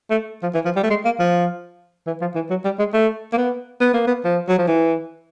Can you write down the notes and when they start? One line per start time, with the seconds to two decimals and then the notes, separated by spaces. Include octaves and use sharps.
0.10 A3
0.43 F3
0.54 E3
0.65 F3
0.76 G3
0.83 A3
0.90 G#3
1.05 A#3
1.19 F3
2.07 E3
2.21 F3
2.35 E3
2.50 F#3
2.64 G3
2.79 G#3
2.93 A3
3.33 A#3
3.37 B3
3.81 B3
3.93 A#3
4.07 B3
4.24 F3
4.48 F#3
4.58 F3
4.67 E3